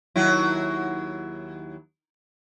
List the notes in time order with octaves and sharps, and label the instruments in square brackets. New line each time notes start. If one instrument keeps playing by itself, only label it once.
[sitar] D#2 F#3 E4